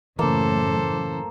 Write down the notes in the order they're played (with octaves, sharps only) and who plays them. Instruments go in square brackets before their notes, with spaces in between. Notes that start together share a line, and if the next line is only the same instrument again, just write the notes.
[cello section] F#2 A2 [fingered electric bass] C#3 E3 [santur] A#3 [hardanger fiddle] A4 C5